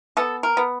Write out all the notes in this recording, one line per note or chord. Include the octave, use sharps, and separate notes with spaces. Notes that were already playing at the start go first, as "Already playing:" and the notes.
B3 A4
A#4
B3